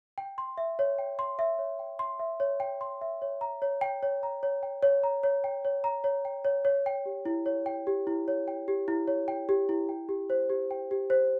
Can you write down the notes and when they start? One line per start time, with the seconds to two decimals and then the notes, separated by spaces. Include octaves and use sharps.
0.18 G5
0.38 C6
0.57 E5
0.79 C#5
0.98 G5
1.19 C6
1.39 E5
1.59 C#5
1.79 G5
1.99 C6
2.19 E5
2.40 C#5
2.60 G5
2.81 C6
3.01 E5
3.22 C#5
3.41 A#5
3.62 C#5
3.81 G5
4.03 C#5
4.23 A#5
4.43 C#5
4.63 G5
4.83 C#5
5.03 A#5
5.23 C#5
5.44 G5
5.65 C#5
5.84 A#5
6.04 C#5
6.25 G5
6.45 C#5
6.65 C#5
6.86 G5
7.06 G4
7.25 E4
7.46 C#5
7.66 G5
7.87 G4
8.07 E4
8.28 C#5
8.48 G5
8.68 G4
8.88 E4
9.08 C#5
9.28 G5
9.49 G4
9.69 E4
9.89 G5
10.09 G4
10.30 C5
10.50 G4
10.71 G5
10.91 G4
11.10 C5